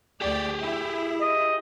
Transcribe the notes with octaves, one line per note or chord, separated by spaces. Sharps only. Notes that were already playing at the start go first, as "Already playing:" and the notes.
D2 G4 G#4 D5 G5
E4
D#5